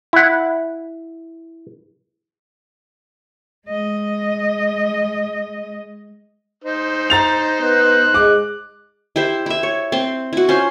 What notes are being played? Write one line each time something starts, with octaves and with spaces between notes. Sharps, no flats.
E4 F#5
G#3 D#5
D#4 C5
A#5 A6 F7
B3 F#6
G#3 D6
E4 G4 C5 E5
E4 E5
C#5
C4 C5
E4 F#4
C#4 F4 C5